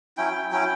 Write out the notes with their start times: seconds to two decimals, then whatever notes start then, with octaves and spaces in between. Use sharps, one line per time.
0.17 F#3 C#4 E4 G5
0.29 G5
0.51 F#3 C#4 E4 G5